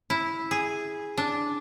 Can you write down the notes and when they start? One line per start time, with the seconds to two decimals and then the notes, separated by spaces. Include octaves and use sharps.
0.10 E4
0.51 G#4
1.17 D4